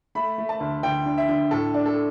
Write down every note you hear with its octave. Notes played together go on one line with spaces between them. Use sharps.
A3 B5
A3
A5
D2
D2 G5
D3
E5
D3
A2 A4
D4
A4